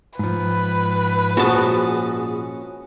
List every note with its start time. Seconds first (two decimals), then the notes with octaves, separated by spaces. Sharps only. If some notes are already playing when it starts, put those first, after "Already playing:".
0.19 G#2 F3 B4
1.37 A#1 G#2 C#4 F#4 G#4 A5